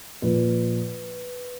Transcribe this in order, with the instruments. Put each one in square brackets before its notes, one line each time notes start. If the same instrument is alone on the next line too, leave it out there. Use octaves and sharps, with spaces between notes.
[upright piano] A#2 F3 B4